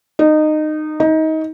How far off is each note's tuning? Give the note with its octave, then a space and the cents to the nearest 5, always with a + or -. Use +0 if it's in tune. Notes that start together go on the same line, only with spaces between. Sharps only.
D#4 -20
D#4 +25